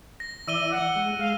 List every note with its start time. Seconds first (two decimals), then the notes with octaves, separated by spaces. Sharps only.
0.20 A#6
0.48 E3 D5 E5 E6 D#7 G7
0.71 F#5
0.96 G#3
1.19 G#3 F5